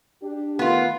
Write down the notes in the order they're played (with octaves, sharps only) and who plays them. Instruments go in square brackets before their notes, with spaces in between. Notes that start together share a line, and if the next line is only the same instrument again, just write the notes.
[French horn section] D4 G4
[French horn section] D#3 A3 [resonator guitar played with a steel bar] B3 F4